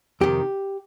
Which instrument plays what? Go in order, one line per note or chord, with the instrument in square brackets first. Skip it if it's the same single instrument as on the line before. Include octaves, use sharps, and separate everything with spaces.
[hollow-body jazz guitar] F2 C3 D#3 G4